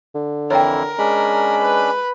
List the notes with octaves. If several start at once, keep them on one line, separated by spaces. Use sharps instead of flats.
D3
F2 E3 E4 A#4 C#5 G5
G#3 C#4 D4 B5
B4